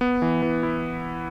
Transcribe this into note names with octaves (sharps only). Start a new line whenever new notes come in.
B3
E3
E3
E4